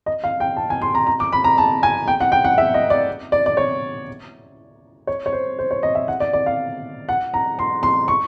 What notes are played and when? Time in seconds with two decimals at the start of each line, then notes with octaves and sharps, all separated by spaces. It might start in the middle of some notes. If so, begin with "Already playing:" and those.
0.06 D#5
0.24 F5
0.40 G5
0.57 A5
0.70 G#5
0.82 C6
0.95 A#5
1.07 A#5
1.20 D6
1.33 B5
1.44 A#5
1.58 A5
1.83 G#5
2.08 G5
2.21 F#5
2.32 G5
2.45 F#5
2.58 E5
2.74 D#5
2.90 D5
3.32 D5
3.46 D5
3.57 C#5
5.07 C#5
5.26 C#5
5.32 C5
5.59 C5
5.71 C#5
5.83 D#5
5.95 E5
6.08 F#5
6.20 D5
6.33 D5
6.46 F5
7.09 F#5
7.34 A#5
7.59 C6
7.83 C6
8.08 C#6